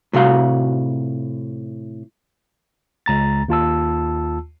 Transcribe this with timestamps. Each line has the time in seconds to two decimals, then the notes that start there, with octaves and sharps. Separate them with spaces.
0.13 A2 C3 F#4 F5
3.06 C#2 A#5 A6
3.48 D#2 F4 A5 E6